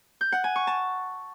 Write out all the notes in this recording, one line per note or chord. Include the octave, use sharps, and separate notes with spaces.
G6
F#5
G#5
C#6
A5